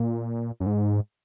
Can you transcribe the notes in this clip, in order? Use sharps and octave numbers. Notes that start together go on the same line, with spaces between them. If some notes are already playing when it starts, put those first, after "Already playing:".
Already playing: A#2
F#2
G#2